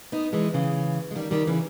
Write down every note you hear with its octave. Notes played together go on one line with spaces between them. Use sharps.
B3 D#4
E3 G#3
C#3 E3
G#3
D#3 G3
D#3 G3
C#3 E3